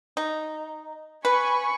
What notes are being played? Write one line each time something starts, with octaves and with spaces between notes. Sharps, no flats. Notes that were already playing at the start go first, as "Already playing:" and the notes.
D#4
B4 G#5 B5 C#6